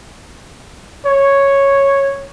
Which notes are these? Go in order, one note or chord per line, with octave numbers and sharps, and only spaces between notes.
C#5